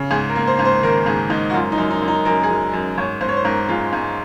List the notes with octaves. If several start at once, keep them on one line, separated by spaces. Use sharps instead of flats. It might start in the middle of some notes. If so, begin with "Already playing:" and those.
Already playing: C#3
G#2 G#4
A#4
A#3
C5
G#2
C5
D#3 A#4
G#2 G#4
G#2 D#4
F#4
F#2 F4
D#4
F#2
D#4
F#2
D#4
F#2 A#4
G#4
F#2
F#2
G#2 C#5
G#2 C5
C#5
C5
G#2 A#4
G#3 F4
G#2